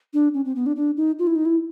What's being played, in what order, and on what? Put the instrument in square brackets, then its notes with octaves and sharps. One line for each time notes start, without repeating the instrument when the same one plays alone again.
[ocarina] D4
C#4
C4
B3
D4
D4
D#4
F4
E4
D#4
E4